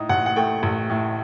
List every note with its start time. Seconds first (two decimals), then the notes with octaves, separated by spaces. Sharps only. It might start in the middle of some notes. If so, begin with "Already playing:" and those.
Already playing: A2 D#4
0.09 A1 F#5
0.26 F#5
0.36 A3 G5
0.63 A1
0.90 A2